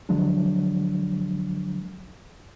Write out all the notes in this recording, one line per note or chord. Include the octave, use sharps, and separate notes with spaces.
D3 F3 F#3 G#3 D4